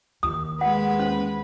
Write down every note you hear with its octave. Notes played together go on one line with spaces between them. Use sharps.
D#2 D#6
G#3 B4 F#5
C#4 C5